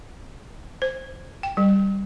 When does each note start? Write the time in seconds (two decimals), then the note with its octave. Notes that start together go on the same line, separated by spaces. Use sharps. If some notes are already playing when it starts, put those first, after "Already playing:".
0.82 C5
1.43 G5
1.57 G3